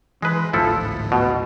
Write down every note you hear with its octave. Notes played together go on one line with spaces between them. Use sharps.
E3 G#3 B4
G#1 D2 A2 F3 E4 A4
B2